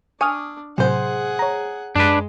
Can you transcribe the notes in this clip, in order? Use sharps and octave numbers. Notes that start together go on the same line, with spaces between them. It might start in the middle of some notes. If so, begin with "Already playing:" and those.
D4 G#5 C#6 D#6 F6
A2 C3 F#3 G#3 G#4 C5 F#5
C#5 A#5
F#2 G#3 D4 B4